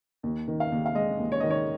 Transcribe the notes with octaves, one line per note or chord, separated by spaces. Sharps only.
D#2
D#3
F5
D#2
F5
G#3 D#5
D#2
C#5
D#3 D#5
C#5